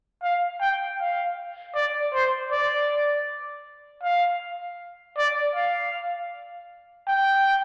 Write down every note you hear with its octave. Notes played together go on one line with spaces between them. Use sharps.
F5
G5
F5
D5
C5
D5
F5
D5
F5
G5